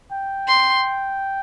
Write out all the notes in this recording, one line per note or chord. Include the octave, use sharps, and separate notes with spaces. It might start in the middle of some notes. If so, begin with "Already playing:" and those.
G5
C6